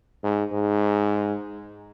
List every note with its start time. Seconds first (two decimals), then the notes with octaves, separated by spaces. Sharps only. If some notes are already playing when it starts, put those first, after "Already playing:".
0.24 G#2
0.53 G#2